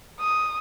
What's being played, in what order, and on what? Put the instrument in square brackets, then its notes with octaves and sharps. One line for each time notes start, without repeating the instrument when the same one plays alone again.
[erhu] D#6